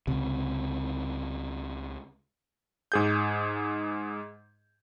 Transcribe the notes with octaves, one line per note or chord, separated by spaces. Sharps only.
C#2 C3
G#2 G#4 G6